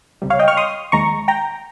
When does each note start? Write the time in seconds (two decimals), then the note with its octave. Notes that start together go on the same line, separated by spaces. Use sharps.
0.22 C#2 C3 G3
0.30 C#5 F5
0.39 D#5 G5
0.48 C#6 F6
0.57 C6 D#6
0.92 D#2 D#3 G#3 A#5 C#6
1.28 G5 A#5